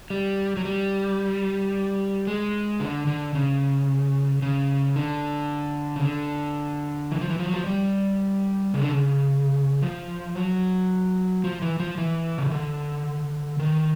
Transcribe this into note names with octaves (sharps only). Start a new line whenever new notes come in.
G3
F#3
G3
G#3
D3
D3
C#3
C#3
D3
C#3
D3
E3
F3
E3
F3
F#3
F3
G3
C#3
D3
C#3
F3
F#3
F3
E3
F3
E3
C#3
D3
D#3